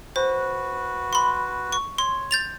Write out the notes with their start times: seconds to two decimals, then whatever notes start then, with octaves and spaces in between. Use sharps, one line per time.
0.16 F#4 B4 C5
1.13 B5 C6
1.72 C#6
1.98 C#5 C6
2.31 G6 A6 F7